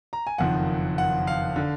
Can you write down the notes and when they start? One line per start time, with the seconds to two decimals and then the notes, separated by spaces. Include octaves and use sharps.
0.13 A#5
0.27 G#5
0.38 F#1 F2 D#3 F#5
0.98 F#5
1.27 F5
1.56 D3